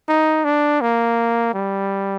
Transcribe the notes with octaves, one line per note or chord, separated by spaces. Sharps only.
D#4
D4
A#3
G3